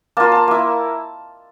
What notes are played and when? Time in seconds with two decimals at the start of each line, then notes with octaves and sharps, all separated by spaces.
0.17 A#3 F4 A5
0.32 A5
0.48 A#3 E4